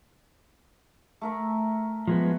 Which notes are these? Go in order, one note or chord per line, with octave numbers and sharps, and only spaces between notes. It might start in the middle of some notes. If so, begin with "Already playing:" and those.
A3 A#4 E5
F3 G#3 B3